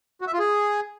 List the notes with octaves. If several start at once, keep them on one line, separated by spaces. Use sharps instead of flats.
F#4
E5
F4
G#4